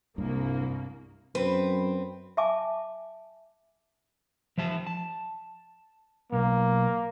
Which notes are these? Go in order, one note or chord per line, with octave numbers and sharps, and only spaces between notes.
C2 G2 A#3
F#2 C4 B4
E5 G#5 A5 D6
F3 E5 A5
A5
B1 A#3